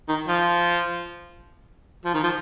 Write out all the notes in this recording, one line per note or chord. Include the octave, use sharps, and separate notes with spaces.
D#3
F3
F3
D#3
F3